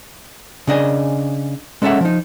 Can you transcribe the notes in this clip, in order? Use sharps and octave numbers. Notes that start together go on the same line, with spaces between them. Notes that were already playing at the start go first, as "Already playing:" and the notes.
C#3 D4 D#5 G#5
G#3 C#4 A4 C#5 E5 F#5
F3 D#4